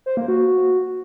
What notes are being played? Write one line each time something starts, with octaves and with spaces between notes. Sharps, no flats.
C5
A#3
F#4